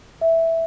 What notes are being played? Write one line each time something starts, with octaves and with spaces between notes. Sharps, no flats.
E5